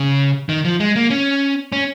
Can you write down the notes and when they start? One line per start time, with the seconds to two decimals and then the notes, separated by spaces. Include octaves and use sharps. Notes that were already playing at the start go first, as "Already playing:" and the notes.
Already playing: C#3
0.49 D#3
0.65 F3
0.80 G#3
0.96 A#3
1.10 C#4
1.72 C#4